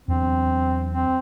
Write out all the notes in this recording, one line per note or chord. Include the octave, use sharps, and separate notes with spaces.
E2 F#3 C4 D4
C4